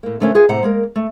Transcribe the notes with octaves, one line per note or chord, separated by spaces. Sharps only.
A2 A#3
F2 D3 A3 A#3 C#4 D4
F4 G#4 B4 F#5
A2 C3 C5 F#5 A#5
G#3 A#3 A#4
A3